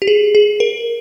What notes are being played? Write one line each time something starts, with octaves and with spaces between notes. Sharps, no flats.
G4
G#4
G#4
A#4